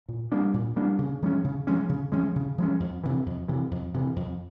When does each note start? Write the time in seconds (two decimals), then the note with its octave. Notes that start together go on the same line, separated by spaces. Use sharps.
0.09 A#2
0.32 G3 A#3 D4
0.54 A#2
0.76 G3 A#3 D4
0.99 C#3
1.22 F3 G#3 C#4
1.44 C#3
1.67 F3 G#3 C#4
1.89 C#3
2.12 F3 G#3 C#4
2.36 C#3
2.58 F3 G#3 C#4
2.80 F2
3.04 C3 E3
3.26 F2
3.48 C3 E3
3.71 F2
3.94 C3 E3
4.16 F2